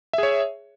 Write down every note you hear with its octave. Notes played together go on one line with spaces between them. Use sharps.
G#4 C#5 E5